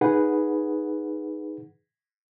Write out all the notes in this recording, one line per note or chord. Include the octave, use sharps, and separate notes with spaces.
D#4 G#4 B4 F#5